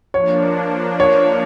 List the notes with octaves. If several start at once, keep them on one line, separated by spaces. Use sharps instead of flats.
F3 A#3 D4 C#5
C#5